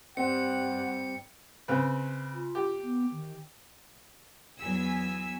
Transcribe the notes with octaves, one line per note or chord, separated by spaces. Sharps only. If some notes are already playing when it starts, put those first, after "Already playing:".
G2 G3 C4 F#5 C#7
C#3 C4 B4
F4
G4
B3
D#3
E2 F#3 B3 G#5 E6 B6